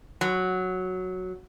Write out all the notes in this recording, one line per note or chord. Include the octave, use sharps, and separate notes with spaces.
F#3